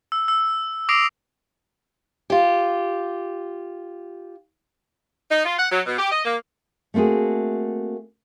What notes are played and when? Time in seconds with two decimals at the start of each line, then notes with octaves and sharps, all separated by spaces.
0.12 E6
0.28 E6
0.89 D6 D#6 A#6 C7 D7 F7
2.30 F4 G4
5.29 D#4
5.45 F4
5.58 F#5
5.71 F#3
5.86 B2
5.98 G4
6.12 D#5
6.25 A#3
6.94 A3 A#3 C4 F#4 G#4